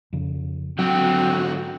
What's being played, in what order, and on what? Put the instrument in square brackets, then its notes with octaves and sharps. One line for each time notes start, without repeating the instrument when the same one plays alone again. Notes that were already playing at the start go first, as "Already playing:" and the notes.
[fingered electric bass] F2 C#3
[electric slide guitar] G#2 D3 G5 [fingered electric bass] F#3 [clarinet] C4 [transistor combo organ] F#4